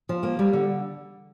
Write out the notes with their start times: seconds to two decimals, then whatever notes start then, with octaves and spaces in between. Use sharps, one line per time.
0.09 F3
0.23 A#3
0.39 G3
0.53 D3